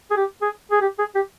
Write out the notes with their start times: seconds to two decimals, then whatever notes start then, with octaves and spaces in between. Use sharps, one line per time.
0.11 G#4
0.17 G4
0.42 G#4
0.71 G#4
0.81 G4
0.99 G#4
1.15 G4